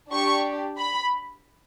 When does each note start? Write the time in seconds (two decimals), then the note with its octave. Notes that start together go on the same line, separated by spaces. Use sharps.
0.11 D4 G4 C#6
0.78 B5